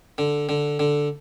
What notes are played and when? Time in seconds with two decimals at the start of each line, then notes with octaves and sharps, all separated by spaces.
0.18 D3
0.49 D3
0.79 D3